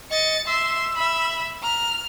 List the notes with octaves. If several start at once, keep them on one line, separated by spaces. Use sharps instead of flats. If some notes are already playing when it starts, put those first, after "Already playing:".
D#5 A6 C#7
E5 C6 E6
E5 B5
A#5 F6